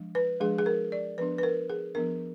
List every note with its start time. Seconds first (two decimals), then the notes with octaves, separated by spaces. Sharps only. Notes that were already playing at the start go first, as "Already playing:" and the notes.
Already playing: F3 G#3 D4
0.15 B4
0.40 F3 G#3 D4 G#4
0.59 G#4
0.66 A#4
0.92 D5
1.18 F3 B3 D4 B4
1.38 B4
1.43 A#4
1.69 G#4
1.95 F3 B3 D4 A#4